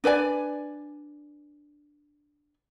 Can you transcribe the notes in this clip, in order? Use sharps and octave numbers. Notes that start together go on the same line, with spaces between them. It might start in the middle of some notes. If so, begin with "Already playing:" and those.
D4 B4 D5 G#5